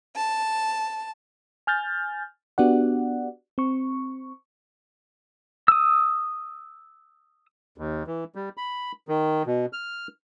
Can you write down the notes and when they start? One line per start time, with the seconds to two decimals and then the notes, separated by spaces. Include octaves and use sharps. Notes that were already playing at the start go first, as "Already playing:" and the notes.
0.16 A5
1.67 G#5 F6 G6 A6
2.58 B3 D4 F#4 G4 D5 F#5
3.58 C4 C#6
5.68 D#6 E6
7.78 D#2
8.07 E3
8.35 G3
8.57 B5
9.08 D#3
9.46 B2
9.73 F6